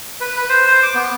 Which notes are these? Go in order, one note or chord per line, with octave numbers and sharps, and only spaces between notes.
B4
B4
C5
C5
D6
B3